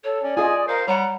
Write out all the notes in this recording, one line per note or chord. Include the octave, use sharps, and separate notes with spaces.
A4 C#5
C#4 D5
F4 G#4 D#5 G#5 D#6
A#4 C5 F5
G3 C#5 F#5 A#5